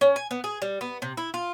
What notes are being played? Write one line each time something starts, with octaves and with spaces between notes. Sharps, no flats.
C#4
G#5
B3
G#4
G3
B3
C3
E4
F4